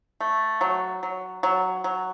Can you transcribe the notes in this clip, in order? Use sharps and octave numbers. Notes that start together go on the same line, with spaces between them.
A3
F#3
F#3
F#3
F#3